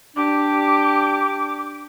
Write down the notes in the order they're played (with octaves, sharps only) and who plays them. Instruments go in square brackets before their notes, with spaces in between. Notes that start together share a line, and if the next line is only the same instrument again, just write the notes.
[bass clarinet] D4 [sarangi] G4 [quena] D6